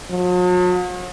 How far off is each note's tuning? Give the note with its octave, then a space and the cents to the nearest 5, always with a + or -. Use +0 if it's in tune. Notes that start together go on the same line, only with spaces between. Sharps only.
F#3 -45